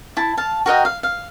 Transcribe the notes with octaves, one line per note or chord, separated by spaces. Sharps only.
E4 A5
F5 A5
F#4 A#4 D#5 G5
F5
F5